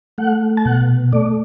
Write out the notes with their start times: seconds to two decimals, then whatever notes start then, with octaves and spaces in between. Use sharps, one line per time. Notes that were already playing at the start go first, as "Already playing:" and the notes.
0.18 A3 F#5
0.57 A5
0.65 B2 F#5
1.12 A3 D5